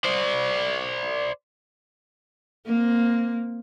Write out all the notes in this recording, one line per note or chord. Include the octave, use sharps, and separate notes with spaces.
C5 D5
A#3 C4